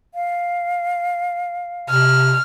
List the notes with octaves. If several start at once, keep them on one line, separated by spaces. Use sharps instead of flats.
F5
C3 F6